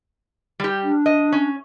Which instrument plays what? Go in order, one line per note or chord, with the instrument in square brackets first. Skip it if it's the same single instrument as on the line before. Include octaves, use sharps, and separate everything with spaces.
[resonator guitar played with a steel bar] G3 G4
[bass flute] D4
[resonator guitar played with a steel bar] D#5
C#4